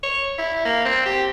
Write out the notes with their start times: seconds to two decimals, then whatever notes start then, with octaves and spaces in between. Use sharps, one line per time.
0.03 C#5
0.38 E4
0.65 A#3
0.85 C4
1.06 G4